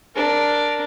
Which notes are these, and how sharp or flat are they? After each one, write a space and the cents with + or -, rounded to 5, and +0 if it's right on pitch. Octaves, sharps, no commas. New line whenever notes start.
D4 +0 A#4 +0